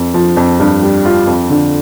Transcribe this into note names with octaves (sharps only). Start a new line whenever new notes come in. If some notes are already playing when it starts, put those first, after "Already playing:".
Already playing: F2
F3
F2
G2
G3
F4
F2
D3